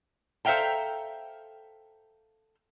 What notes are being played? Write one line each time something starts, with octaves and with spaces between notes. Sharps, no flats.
A4 C5 E5 F5 G5 A#5